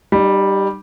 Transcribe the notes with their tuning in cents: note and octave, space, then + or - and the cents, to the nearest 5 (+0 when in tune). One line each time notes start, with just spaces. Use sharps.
G3 +0 D#4 -35